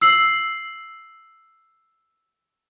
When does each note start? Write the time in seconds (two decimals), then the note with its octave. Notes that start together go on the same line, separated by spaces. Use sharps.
0.01 E6 C7 F#7